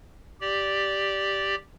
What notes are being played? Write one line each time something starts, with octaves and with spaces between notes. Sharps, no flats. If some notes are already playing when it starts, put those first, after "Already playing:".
G4 D5